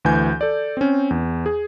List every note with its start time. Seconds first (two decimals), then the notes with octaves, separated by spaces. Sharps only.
0.05 D2 E3 G#5 G6
0.41 A4 D5
0.77 C4 C#4
1.11 E2
1.46 G#4